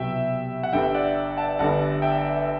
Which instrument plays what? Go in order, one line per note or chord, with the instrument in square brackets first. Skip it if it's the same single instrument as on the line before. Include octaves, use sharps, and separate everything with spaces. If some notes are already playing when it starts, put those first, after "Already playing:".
Already playing: [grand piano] C2 B2 F#3 [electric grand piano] E5 G5
[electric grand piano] F#5
[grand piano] G1 G2 D3 [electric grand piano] E5 G5
[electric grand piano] D5 F#5
F#5 A5
[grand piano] G1 G2 D3 [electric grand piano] F#5 A5
[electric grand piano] E5 G5